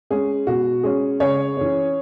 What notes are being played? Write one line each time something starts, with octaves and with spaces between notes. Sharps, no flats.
G#3 C#4 G#4
B2 F#4
G#3 C#4 G#4
C#3 G#4 C#5
E3 C#4